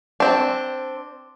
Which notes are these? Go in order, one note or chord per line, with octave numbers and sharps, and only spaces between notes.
C4 D4